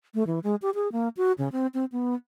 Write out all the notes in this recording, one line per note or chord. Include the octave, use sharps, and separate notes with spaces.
A3
E3
G#3
G4
G#4
A#3
F#4
C#3
C4
C4
B3